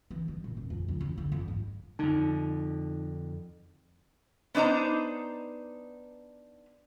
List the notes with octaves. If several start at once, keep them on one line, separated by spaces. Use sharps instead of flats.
E3
G3
A#2
D#1
F2
C#2
E2
D3
F2
G#2
F2 D3 D#4
B3 D4 D#4 C5 A#5